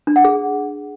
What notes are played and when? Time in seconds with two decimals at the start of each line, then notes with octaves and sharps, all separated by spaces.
0.07 D4
0.16 F#5
0.24 G#4